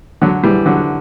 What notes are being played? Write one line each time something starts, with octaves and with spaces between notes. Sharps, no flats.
D3 F#3
E3 G3
D3 F#3